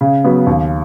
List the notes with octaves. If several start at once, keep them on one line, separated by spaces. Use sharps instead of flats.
C#3
F#3 B3
D#2